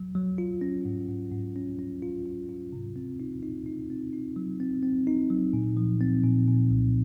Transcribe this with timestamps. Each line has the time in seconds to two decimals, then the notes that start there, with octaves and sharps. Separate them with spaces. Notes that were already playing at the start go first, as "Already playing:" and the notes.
Already playing: F#3
0.15 F#3
0.38 F4
0.61 C#4
0.85 G#2
1.08 G#2
1.32 G#2
1.56 C#4
1.79 C#4
2.02 F4
2.26 F4
2.49 F4
2.73 C3
2.96 C4
3.20 D#4
3.43 D#4
3.66 D#4
3.90 C4
4.13 D#4
4.36 F#3
4.60 C4
4.83 C4
5.07 D#4
5.30 F#3
5.53 A#2
5.77 F3
6.01 C4
6.23 A#2
6.48 A#2
6.70 C2